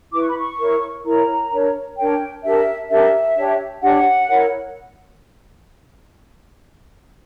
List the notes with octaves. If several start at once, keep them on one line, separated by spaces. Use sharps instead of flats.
E4 B4 D6
C#6
B5
C#6
E4 A#4 C#5
E4 A#4 C#5 A#5
D4 A#4 C#5
D4 A#4 C#5 G5
D4 G4 A#4 E5
D4 G4 A#4 E5
D4 G4 C#5
D4 G4 C#5 F#5
E4 A#4 C#5